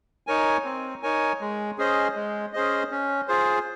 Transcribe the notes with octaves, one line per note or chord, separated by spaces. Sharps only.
D#4 A#4 C#5 G#5
C4
D#4 A#4 C#5 G#5
G#3
C#4 G#4 C5 D#5
G#3
C#4 G#4 C5 D#5
C#4
F4 G#4 C5